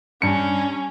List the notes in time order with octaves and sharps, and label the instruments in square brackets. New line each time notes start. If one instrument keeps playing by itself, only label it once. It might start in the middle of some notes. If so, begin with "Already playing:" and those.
[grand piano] G2 C#7 [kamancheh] C#4